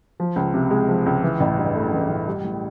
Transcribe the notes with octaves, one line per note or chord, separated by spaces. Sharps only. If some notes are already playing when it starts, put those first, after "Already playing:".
F3
C#2
C3
G#3
F3
C#2
E3
A1
G2
A3
E3
A1
G3
A2